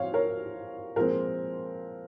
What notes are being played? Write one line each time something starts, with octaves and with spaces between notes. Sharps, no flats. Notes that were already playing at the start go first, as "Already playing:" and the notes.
Already playing: F3 C4 C#5 F5
A#4 C#5
A#2 F3 G#3 C4 A#4